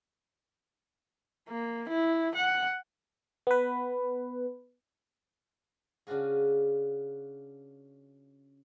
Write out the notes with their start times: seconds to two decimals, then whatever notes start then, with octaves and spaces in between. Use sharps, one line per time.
1.48 A#3
1.89 E4
2.35 F#5
3.47 B3 B4
6.07 C#3 D4 F4 F#4 G#4